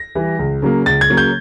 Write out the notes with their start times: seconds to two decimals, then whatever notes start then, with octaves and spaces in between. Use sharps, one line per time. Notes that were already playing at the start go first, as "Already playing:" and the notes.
Already playing: A#6
0.15 E3 G3
0.39 C#2
0.62 C#3 F#3 A#3
0.86 C#2 A6
1.01 G#6
1.10 C#3 F#3 A#3
1.17 G6